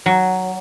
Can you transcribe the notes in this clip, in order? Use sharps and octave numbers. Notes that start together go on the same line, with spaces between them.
F#3